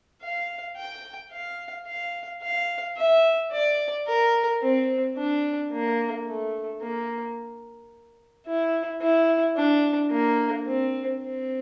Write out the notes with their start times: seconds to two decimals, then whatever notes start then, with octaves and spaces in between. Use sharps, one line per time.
0.22 F5
0.77 G5
1.32 F5
1.87 F5
2.42 F5
2.97 E5
3.52 D5
4.07 A#4
4.62 C4
5.17 D4
5.72 A#3
6.27 A3
6.82 A#3
8.47 E4
9.02 E4
9.57 D4
10.11 A#3
10.66 C4
11.22 C4